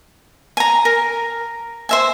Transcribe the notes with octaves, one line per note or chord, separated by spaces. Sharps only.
G#5 A#5
A#4
C5 E5 G#5